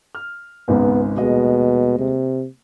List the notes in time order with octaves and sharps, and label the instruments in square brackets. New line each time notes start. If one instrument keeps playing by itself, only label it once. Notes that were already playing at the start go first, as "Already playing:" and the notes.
[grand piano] F6
[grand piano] G#1 C#2 G#2 [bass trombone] B3
[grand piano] D#1 G#3 D#5 [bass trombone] B2
[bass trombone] C3